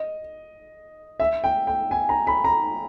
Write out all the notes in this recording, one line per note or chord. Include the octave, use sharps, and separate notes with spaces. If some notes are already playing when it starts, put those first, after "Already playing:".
Already playing: D#5
E5
G5
G5
G#5
A#5
B5
A#5